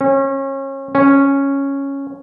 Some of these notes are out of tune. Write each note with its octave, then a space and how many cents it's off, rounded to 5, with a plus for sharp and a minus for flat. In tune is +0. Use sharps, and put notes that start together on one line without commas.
C#4 -30
C#4 -5